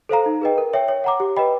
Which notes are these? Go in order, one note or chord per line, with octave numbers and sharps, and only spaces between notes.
A4 C5 F5 A#5
D#4
G#4 B4 D#5 G5
A#4
C#5 E5 G5
C#5
F#5 A#5 D6
G4
B4 D#5 G5 B5